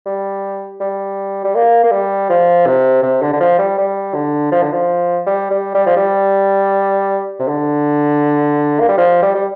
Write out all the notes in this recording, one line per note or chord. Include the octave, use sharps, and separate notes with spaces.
G3
G3
G3
A#3
A#3
G3
F3
C3
C3
D3
D3
F3
G3
G3
D3
F3
D3
F3
G3
G3
G3
F3
G3
C3
D3
A#3
G3
F3
G3
G3